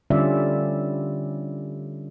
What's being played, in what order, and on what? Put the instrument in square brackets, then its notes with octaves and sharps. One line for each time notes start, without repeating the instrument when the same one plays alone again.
[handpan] D3 G3 C#4 F4 D5 E5